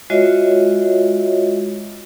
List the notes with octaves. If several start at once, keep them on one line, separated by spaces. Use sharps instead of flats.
G#3 F4 F#4 C#5 D#5 E5